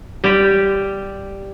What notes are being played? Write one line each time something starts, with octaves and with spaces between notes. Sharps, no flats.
G3 G4